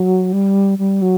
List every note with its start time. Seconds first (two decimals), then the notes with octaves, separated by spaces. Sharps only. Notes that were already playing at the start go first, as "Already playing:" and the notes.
Already playing: F#3
0.33 G3
0.79 G3
1.02 F#3